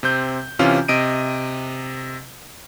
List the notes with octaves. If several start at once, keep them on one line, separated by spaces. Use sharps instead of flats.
C3 C4 G6
C3 E3 C#4 F4
C3 D#5 D7 D#7